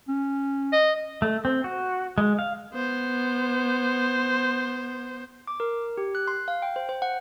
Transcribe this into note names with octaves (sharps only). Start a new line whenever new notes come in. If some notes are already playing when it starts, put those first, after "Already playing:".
C#4
D#5
A3
C4
F#4
G#3
F5
B3 C5
D6
A#4
G4
F#6
C6
F5
G5
C5
C5
F#5